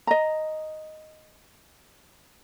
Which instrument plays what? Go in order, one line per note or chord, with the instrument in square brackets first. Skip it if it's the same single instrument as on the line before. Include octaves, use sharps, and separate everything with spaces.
[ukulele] D#5 A#5